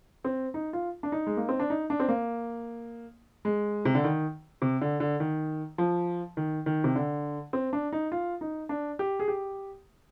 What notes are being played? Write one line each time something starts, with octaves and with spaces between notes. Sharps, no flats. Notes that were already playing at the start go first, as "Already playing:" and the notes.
C4
D#4
F4
D4
D#4
G#3
A#3
C4
D4
D#4
D4
C4
A#3
G#3
C3
D3
D#3
C3
D3
D3
D#3
F3
D#3
D#3
C3
D3
C4
D4
D#4
F4
D#4
D4
G4
G#4
G4